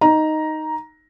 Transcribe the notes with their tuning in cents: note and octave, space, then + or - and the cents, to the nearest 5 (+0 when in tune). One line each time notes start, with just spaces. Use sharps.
D#4 +0 A#5 +10